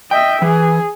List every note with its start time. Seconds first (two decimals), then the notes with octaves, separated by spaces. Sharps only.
0.11 D#5 E5 G5
0.42 E3 G#4